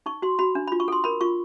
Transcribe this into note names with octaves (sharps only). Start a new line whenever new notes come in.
D#4 C#6
F#4 C6
F#4 B5
D4
B5
F4
C#6
A4 C6
A#4 B5
F4 C#6